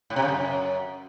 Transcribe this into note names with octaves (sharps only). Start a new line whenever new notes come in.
A2
C3
C#3
F#2